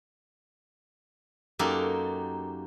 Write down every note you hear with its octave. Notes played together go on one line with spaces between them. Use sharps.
F#2 A#3 D#4 G4 A4